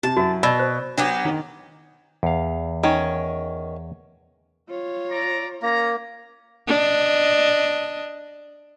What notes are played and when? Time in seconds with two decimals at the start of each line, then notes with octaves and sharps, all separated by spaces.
0.03 C3 A5
0.17 F#2 E4 F#4
0.43 B2 D5 B5 E6
0.59 C5
0.98 F#3 B3 D4 G4
1.25 D#3
2.23 E2 F5
2.83 D#3 C#4
4.69 F4 C#5
5.11 D5 A#5
5.62 A#3 C#4 A#5
6.68 D4 D#5